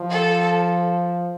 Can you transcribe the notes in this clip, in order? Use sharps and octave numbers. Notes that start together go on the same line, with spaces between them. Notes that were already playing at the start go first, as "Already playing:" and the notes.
Already playing: F3
A4